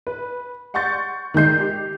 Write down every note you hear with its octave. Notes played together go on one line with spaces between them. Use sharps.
B4
F#5 C6 C#6 G6 A6
D#3 G#3 G6 C7
G4